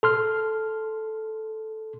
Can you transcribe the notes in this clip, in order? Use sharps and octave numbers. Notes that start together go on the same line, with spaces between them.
A4 C6 F6